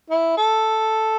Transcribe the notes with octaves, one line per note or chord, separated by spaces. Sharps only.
E4
A4